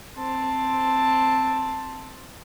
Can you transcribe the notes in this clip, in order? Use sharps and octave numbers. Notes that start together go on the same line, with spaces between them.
C4 A5